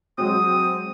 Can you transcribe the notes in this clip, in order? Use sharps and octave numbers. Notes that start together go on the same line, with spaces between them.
F#3 G#3 C4 D#6